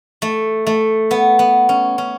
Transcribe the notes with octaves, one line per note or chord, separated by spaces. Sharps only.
A3
A3
B3
B3
C#4
C#4